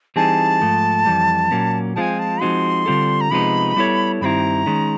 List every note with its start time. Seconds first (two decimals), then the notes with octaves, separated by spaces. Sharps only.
0.16 E3 G3 C4 D#4 G#4 A5
0.62 G#2 F3 A3
1.06 F2 C3 E3 G3
1.51 A#2 F#3 A#3 C#4
1.96 F3 G#3 C4 F4 G#5 A5
2.19 A5
2.41 F3 G#3 C4 D#4 F#4 C6
2.86 D3 G3 C4 F4 A4
3.21 A#5
3.31 C3 F3 G#3 B3 D#4 B5
3.76 G3 B3 E4 A4 C#5
4.21 G2 D#3 G3 C4 E4 A#5 B5
4.66 D#3 G#3 C#4